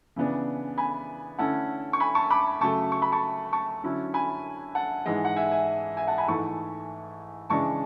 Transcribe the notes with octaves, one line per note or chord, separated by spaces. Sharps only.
C#3 E3 B3 D4
G#5 B5
D3 A3 C#4 E4 F#5 A5
C#6
G#5 B5
A5 C#6
B5 D6
C#3 F#3 A3 A5 C#6
C#6
B5
A5 C#6
A5 C#6
D3 F#3 C#4 E4
G#5 B5
F#5 A5
G#2 E3 G#3
F#5
E5 G#5
E5 G#5
E5 G#5
F#5 A5
G#5 B5
G#2 E3 A3 E4 A5 C#6
C#3 E3 G#3 D4 A5 C#6